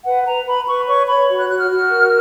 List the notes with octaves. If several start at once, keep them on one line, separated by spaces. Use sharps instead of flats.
B4 F#5
B4 A#5
B4 B5
B4 C#6
C#5 C#6
C#5 B5
F#4
F#6
F#4 F#6
F6
F#4
A#4